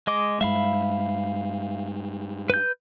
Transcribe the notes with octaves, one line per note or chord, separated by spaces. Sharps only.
G#3 D#5 D6
G2 G#3 E5 F5 B5
B4 G6